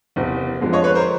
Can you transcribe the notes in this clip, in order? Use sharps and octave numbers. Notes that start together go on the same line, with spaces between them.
F#1 E2 C3
F2 D3 F3 G#3
C#5 D#5
B4 C#5
A#4 C5